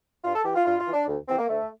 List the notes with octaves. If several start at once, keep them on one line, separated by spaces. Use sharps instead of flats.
G2 F4
A4
E3 G4
F4
G2 F4
F4
E3
D4
D2
C3 E3 C4
A#3
D2 A3